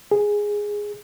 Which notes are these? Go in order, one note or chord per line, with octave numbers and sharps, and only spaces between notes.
G#4